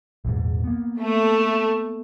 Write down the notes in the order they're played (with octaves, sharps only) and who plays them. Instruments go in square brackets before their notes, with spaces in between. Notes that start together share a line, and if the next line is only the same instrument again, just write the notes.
[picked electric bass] A#1 E2 G#2
A#3 B3
[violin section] A3